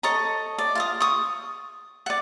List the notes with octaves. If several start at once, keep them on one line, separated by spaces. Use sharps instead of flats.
A4 C#5 D#5 A#5
D5
F4 F5 D#6
C#6 D#6
D5 F#5